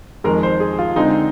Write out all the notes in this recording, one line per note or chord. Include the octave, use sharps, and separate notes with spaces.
F2 D#3 G#3 A#4
C5
G#4
F4
D3 G#3 C4 D#4